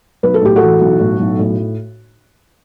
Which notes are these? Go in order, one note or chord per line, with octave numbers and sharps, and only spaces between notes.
B1 B4
A4
A2 G4
F#4 A4
E3
B1
A2
B1
A2